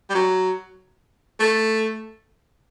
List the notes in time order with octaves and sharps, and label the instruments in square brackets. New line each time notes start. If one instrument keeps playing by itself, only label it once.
[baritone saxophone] G3
F#3
A3